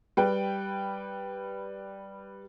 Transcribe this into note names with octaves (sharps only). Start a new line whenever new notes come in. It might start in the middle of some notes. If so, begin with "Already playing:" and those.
G3 B4 G5